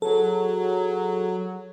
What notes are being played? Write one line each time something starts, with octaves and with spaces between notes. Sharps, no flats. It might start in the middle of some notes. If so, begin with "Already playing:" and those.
F#3 G#4 A4